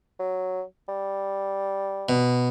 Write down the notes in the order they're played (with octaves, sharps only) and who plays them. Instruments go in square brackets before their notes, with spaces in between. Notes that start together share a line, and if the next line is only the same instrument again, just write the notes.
[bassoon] F#3
G3
[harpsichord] B2